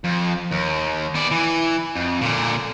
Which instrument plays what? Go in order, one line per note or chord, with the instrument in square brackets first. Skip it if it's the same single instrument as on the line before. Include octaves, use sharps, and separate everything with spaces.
[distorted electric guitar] F2
D#2
B3 D5
E3
F2
A#2 D3